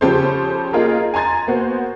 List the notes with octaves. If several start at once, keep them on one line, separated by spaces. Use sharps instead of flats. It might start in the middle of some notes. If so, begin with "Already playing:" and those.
C#3 F3 C#4 G4 A4 C5
A#3 D#4 F4 G#4 A#4
G#5 A#5 C6 G#6 A6
A#3 B3 F#4 C5